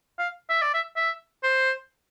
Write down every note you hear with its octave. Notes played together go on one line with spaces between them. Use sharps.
F5
E5
D5
E5
E5
C5